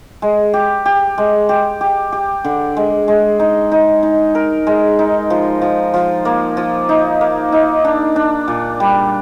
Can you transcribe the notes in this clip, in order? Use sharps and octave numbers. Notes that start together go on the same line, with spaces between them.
G#3
G4
G4
G#3
G4
G4
G4
D3
G#3
G#3
D#4
D#4
D#4
A#4
G#3
D#4
F3
F3
F3
A#3
F3
D#4
A#3
D#4
D4
D4
A#2
G3